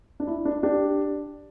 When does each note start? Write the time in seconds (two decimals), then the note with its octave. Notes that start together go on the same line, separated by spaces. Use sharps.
0.20 D4
0.27 E4
0.45 D4
0.63 D4 G4